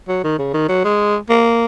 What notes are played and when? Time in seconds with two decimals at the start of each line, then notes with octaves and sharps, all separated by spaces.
0.08 F#3
0.23 D#3
0.38 C#3
0.54 D#3
0.69 F#3
0.85 G#3
1.29 A#3